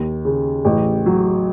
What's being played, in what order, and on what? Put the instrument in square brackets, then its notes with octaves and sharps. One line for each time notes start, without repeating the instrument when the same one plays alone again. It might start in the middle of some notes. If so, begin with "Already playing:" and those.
Already playing: [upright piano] D#2
C#3
A1
F#3